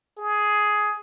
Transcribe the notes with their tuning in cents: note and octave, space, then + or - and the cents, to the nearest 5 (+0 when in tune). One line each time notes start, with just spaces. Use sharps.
G#4 +10